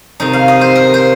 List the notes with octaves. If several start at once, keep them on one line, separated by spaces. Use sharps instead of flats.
C3 D#3 C4 D#4
F5
D#5
C5
A#4
C5